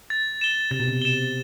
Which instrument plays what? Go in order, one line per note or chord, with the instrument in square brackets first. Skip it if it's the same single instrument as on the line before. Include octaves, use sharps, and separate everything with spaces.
[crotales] A6
E7 G7
[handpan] C3 [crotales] A6
[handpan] B2
C3
[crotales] E7 G7